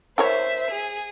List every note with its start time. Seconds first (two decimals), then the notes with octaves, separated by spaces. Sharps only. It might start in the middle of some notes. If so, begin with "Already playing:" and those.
0.18 E4 A#4 C5 C#5 E5
0.71 G#4